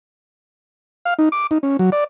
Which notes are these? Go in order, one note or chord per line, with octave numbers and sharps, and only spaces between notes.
F5
D#4
D6
D#4
C#4
F#3
D5